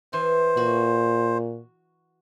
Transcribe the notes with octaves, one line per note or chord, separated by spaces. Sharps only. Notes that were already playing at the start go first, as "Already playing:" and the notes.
E3 C5
A#2 F#4